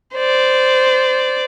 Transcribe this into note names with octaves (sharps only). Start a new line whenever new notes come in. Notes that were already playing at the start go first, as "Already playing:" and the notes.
C5 D5